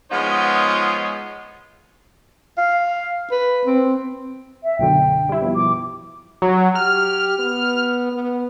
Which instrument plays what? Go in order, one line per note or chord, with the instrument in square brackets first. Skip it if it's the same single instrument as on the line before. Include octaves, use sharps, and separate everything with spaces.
[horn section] F3 G#3 B3 D#4 F4 C#5
[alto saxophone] F5
B4
C4
[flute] E5
[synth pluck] B1 F#2 D3 [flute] G5
[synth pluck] G3 E4
B2 F3
[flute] D6
[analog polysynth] F#3
[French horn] G4 [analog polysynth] F6
[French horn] B3
B3